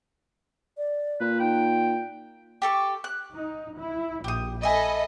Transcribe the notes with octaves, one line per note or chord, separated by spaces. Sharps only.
D5
A#2 B4
D#4 G5
G4 A4 C#6
F#6
D#4
E4
A#1 G4 D#6
A4 D#5 E5 G#5 B5